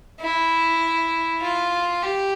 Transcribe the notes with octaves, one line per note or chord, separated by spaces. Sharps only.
E4
F4
G4